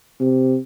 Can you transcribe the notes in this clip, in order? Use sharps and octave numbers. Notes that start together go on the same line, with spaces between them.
C3